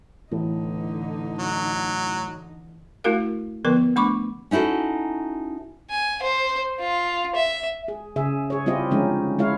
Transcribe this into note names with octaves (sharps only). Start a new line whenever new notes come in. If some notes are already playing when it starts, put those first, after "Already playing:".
A2 D3 E3 D#4
F#3
A3 E4 F#4 A#4 F5
D3 F3 B3 A#4 B4
A3 D4 B5 C#6 D6
C#4 D#4 E4 F#4 A4
G#5
C5
F4
E5
G#4
C#3 G#4 E5
G#4 C#5
G3 C4 E4 F4 G4 D#5
D3 F3 G#3 C#4 D#4
G#3 E4 F4 C#5 F5